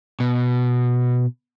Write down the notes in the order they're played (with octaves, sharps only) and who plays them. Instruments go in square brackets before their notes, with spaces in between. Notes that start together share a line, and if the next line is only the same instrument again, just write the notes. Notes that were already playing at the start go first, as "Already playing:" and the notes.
[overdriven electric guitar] B2